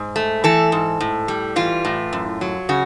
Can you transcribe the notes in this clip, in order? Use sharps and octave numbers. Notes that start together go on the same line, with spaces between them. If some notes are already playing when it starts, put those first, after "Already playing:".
Already playing: G#2
A3
E3 A4
G#2
A2
G3
E3 F4
A2
F#2
F#3
C#3 F#4